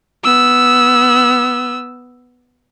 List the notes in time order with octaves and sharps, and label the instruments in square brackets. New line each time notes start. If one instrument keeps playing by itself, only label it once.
[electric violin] B3 E6